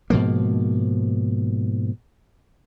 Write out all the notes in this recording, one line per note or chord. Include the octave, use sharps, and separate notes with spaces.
G#2 B2 F3 A#3